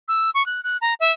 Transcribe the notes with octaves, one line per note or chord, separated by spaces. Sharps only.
E6
C#6
F#6
F#6
A#5
E5